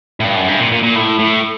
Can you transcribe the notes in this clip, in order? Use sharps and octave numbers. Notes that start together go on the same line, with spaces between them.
A2
G2
F#2
G2
A#2
A#2
A#2
A2
A2